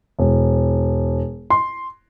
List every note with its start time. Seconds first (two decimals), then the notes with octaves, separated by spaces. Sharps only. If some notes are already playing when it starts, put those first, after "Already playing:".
0.19 E1
1.50 C6